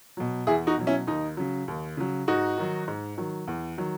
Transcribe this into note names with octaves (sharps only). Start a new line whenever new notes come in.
B2 F#3
E2 E4 G#4
D#4 F#4
B2 F#3
C#4 E4
D#2 D#4
C#3 F#3
D#2
C#3 F#3
G#2 D#4 F#4
D#3 F#3
G#2
D#3 F#3
E2
D#3 F#3